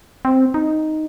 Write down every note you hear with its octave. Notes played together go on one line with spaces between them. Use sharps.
C4
D#4